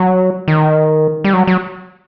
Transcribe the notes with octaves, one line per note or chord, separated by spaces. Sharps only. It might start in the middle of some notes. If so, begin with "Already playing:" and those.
Already playing: F#3
D#3
G3
F#3
F#3